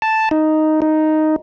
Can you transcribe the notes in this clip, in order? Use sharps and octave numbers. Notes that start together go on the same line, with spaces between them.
A5
D#4
D#4